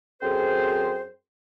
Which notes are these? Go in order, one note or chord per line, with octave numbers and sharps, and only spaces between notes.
F#2 C4 G#4 A4 C5